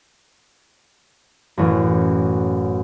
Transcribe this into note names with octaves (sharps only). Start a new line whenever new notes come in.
A1 F#2